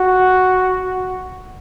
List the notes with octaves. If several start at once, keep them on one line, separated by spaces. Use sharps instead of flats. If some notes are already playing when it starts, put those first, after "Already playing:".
Already playing: F#4